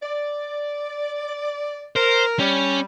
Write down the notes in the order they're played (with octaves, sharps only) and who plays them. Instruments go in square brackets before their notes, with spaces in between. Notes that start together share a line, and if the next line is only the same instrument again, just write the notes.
[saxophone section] D5
[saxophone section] A#4 [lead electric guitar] C5
[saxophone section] G3 [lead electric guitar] C#4